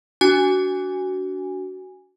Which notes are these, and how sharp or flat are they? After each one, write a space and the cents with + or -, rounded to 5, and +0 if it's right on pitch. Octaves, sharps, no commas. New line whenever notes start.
D4 -25 F#4 +15 G#5 -15